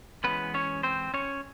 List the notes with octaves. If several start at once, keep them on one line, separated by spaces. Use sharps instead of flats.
E3 G#3 B3 C#4 B4
C#4 C#5
C4 C5
C#4 C#5